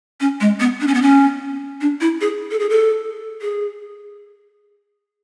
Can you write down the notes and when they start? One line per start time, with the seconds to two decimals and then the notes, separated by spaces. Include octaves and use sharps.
0.20 C#4
0.41 G#3
0.60 B3
0.81 D4
0.87 C#4
0.94 B3
1.02 C#4
1.81 D4
2.01 E4
2.21 G#4
2.51 A4
2.59 G#4
2.70 A4
3.42 G#4